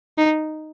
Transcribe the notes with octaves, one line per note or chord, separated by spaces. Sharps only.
D#4